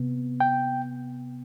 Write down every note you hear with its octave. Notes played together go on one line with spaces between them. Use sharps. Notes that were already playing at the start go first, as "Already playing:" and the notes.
Already playing: C3 B3
G5